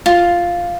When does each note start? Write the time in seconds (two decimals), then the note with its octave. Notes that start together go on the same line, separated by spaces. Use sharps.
0.06 F4